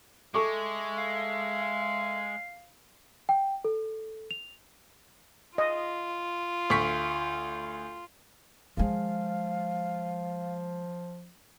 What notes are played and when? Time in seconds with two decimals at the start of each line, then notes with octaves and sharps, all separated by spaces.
0.34 G#3 A4 E5 C#6 D6
0.98 F5
3.29 G5
3.64 A4
4.31 F7
5.58 F4 D#5
6.70 D2 C#6 B6
8.77 D#3 F3 G#3 F5